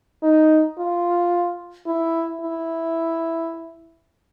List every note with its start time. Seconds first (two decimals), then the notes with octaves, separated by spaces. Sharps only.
0.23 D#4
0.78 F4
1.86 E4
2.42 E4